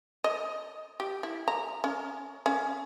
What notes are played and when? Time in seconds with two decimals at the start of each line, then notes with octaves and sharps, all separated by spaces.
0.24 D#5
1.00 G4
1.23 E4
1.48 A#5
1.84 C#4
2.46 C#4